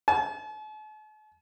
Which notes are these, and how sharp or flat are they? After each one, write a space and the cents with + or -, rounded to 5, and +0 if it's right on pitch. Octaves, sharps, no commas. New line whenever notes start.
A5 -45